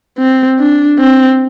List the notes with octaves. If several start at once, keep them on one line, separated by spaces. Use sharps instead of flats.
C4
D4
C4